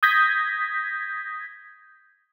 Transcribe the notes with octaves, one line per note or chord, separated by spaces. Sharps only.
D#6 G6 G#6 A#6 B6